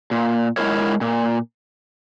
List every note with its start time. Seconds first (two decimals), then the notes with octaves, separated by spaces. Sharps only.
0.11 A#2
0.57 G#3 E4 A#4 C#5
1.01 A#2